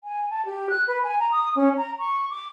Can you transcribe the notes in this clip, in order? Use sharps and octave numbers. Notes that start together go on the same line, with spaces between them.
G#5
A5
G4
F#6
B4
G#5
A#5
D#6
C#4
A#5
C#6
D6